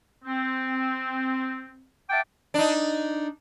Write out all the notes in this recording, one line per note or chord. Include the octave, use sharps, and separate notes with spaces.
C4
E5 F#5 G5 A5 D6
D4 D#4